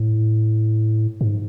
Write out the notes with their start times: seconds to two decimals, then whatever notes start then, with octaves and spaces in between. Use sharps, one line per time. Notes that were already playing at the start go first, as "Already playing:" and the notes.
Already playing: A2
1.21 G#2